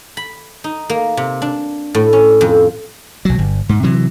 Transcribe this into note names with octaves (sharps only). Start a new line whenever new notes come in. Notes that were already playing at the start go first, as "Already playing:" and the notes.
B5
D#4
A#3
C3
D4
A2
C#4
F2
B1 F#3
G1
G#2
C3 E3 F#3